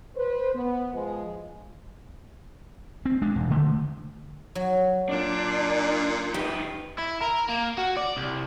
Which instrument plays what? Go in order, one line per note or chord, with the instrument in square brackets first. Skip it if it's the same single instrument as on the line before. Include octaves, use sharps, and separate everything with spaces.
[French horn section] B4 C5
B3
F3 G#3
[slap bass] C4
G#3 D4
E1
D3 A3
[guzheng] F#3
[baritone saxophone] A#2 [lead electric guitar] D4
[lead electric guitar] D#3 B4 [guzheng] G4
[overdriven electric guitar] E4
A#4
A#3
F#4
D5
C2